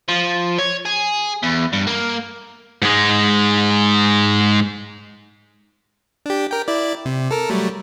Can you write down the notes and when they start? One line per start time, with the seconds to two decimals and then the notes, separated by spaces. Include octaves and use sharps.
0.08 F3
0.59 C#5
0.85 G#4
1.43 E2
1.73 G2
1.87 A#3
2.82 G#2 G#3
6.26 D4 G4
6.51 A#4 G5
6.68 E4 D5
7.05 C3
7.31 A4 A#4
7.50 F#3 G3 A3